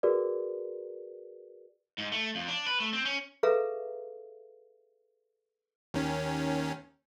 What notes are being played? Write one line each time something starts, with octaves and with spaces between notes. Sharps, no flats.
F#4 G#4 A#4 B4 D5
G#2
A3
F2
D4
B4
A3
C4
C#4
G#4 A4 B4 E5 F5 A#5
D#2 D#3 C#4